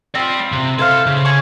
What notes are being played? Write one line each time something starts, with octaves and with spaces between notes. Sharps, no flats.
C4 F4 D5 G5
C3
E4 A4 C5 F5
C#3
G#4 C#6